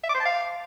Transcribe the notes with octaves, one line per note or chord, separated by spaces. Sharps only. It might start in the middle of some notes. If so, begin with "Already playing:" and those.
E5
D6
C5
A5
F5